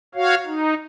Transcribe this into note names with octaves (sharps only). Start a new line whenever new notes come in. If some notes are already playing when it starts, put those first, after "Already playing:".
F#4 C#5 F5
D#4